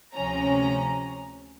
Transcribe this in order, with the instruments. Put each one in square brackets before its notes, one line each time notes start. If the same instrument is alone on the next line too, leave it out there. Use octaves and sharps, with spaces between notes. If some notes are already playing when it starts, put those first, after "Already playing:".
[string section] D2 C3 F3 C#4 A#5